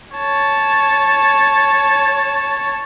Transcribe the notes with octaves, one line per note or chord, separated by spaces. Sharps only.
C#5 A5